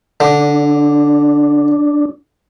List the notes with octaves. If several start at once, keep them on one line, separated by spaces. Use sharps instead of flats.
D3 D4